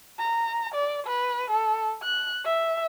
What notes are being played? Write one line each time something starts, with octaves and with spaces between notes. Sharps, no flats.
A#5
D5
B4
A4
F#6
E5